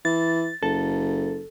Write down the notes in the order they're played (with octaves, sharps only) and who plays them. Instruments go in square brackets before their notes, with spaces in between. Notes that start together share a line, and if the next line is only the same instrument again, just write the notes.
[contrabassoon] E3 [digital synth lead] A6
[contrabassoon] F#1 [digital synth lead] A4